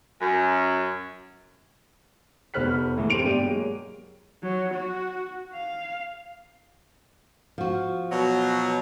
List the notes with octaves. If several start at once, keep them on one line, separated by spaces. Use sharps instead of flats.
F#2
F1 B3 C5 F6 F#6 B6
A2 E3 A#3
A3 C4 G4 C6 D7 F7
G2 B2 G4 D5 D#7
F#3 G#3 A#3
F#3
F#4
F5
F3 F#4
B2 F#3